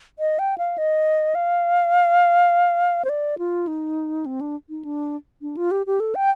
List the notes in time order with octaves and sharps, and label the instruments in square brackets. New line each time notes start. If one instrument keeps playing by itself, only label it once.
[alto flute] D#5
G5
F5
D#5
F5
C5
D5
F4
D#4
C4
D4
D#4
D4
D4
F4
G4
G4
A4
G5